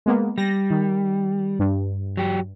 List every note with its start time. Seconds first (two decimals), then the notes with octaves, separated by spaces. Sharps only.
0.06 G#3 A#3 B3
0.38 G3 A#6
0.70 D#3
1.59 G2
2.17 F#3 G4